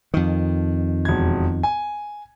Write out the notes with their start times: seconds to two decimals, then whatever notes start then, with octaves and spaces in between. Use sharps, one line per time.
0.14 F2 D#3
1.05 E1 G#6
1.63 G#5